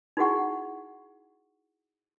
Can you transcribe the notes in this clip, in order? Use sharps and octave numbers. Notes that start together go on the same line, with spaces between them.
D#4 E4 F#4 G#4 F#5 C#6